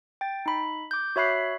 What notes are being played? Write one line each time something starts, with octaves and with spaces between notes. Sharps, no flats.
G5 A6
D#4 B5
D6 G6
F#4 C#5 E5 B5 F#6 C7